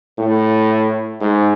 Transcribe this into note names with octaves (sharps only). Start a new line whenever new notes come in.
A2
G#2